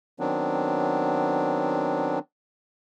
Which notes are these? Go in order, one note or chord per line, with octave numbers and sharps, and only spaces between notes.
D#3 F#3 B3 C4 D4